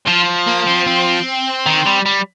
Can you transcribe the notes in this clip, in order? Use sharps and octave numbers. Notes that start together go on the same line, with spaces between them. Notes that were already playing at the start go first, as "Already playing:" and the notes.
F3 F4
A#3
C4
C4
D#3
G3
G3